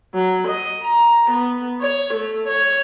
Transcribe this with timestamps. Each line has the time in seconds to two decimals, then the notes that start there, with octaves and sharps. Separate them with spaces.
0.14 F#3
0.48 D#5
0.84 A#5
1.31 B3
1.81 C#5
2.14 A3
2.48 C#5